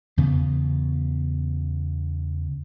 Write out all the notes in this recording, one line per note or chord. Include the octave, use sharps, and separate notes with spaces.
E2 C#3 B3